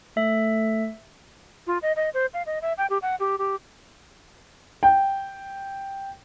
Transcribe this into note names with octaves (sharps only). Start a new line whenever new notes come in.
A3 E5
F4
D#5
D#5
C5
F5
D#5
E5
G5
G4
F#5
G4
G4
G5